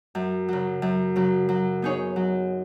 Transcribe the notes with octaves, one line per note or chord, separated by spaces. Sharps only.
F#2
C#3 F#3
F#2
C#3 F#3
F#3
B3 D#4 G#4 C#5
F#3